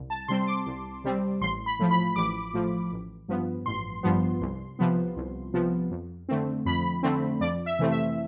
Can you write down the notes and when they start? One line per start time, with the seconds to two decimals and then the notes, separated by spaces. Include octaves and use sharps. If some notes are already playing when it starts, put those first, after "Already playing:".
Already playing: C2
0.10 A5
0.28 C3 G3 C4 C6
0.47 D6
0.66 C2
1.04 C3 G3 C4
1.41 A1 C6
1.66 B5
1.79 A2 F3
1.91 B5
2.16 A1 D6
2.54 A2 F3
2.92 A1
3.28 G2 F3 B3
3.66 A1 C6
4.03 G2 F3 B3
4.41 C2
4.79 C3 F3 B3
5.16 C2
5.54 C3 F3 B3
5.91 F2
6.29 D3 A3 C4
6.66 F2 B5
7.03 D3 A3 C4
7.40 F2 D5
7.66 E5
7.79 C3 E3 A3 C4
7.91 E5